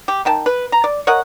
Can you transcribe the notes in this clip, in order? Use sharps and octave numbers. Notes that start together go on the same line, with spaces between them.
G4
D#3 G5 A5
B4
A#5
D5
A#4 C#5 D#5 F#5